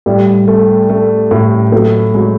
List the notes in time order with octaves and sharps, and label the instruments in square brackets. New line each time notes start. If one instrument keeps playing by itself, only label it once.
[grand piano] A2 [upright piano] G3
[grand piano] A3
A3
A2
[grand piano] F#3 [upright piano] A3
[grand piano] F#3 [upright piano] G#3